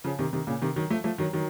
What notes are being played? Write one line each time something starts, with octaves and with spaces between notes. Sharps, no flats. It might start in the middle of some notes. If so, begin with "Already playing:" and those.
C#3 F3
C3 D#3
C3 D#3
A#2 C#3
C3 D#3
D#3 F#3
F3 A3
F3 A3
D#3 F#3
D#3 F#3